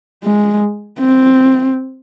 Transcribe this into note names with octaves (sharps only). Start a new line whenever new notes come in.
G#3
C4